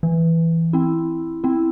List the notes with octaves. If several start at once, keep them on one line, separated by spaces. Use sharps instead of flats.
E3
C4 E4
C4 E4